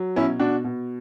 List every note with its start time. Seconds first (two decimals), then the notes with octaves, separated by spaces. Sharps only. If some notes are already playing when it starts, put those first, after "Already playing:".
Already playing: F#3
0.16 B2 C#4 E4
0.39 B2 D4 F#4
0.64 B2